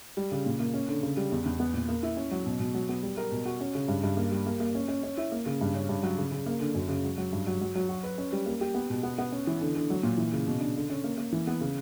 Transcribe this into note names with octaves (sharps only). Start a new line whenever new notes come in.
G3
C#3
A#2
A#3
C#4
D3
C#3
G3
E2
E2
B3
A#2
A#3
E4
C#4
F#3
B2
B2
F#3
B3
G3
A#4
B2
F#4
C#4
C#3
G2
G2
A#3
G3
A#3
A#3
C#4
C#4
C#4
E4
A#3
C#3
G2
C#4
G2
F#3
C#3
C#3
A#3
D3
F#2
C#3
F#3
F#3
G2
F#3
F#3
F#3
F#4
B4
C#4
G3
A#3
G4
B3
B2
B3
B3
C#4
E3
D3
D3
F#3
A#2
E3
C#3
B2
D4
D3
C#4
A#3
A#3
E3
B3
C#3